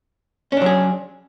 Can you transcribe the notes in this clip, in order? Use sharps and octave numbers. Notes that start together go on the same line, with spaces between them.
F#3 C#4 D4 G#4